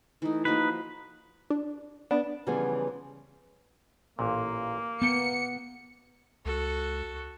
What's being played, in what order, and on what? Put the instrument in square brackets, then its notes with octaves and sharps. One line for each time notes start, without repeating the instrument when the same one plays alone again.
[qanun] E3 A3 [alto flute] D#4
[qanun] F3 A#3 F#4 [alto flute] D#4 [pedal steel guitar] B4
[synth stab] D4
[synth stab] B3 [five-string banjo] D4
[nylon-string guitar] C#3 E3 F3 G3 B3 G#4
[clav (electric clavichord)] A1 A#2 [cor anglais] A#3
[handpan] B3 [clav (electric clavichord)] G5 A5 [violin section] C#7
[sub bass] C#2 [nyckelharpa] F#4 A4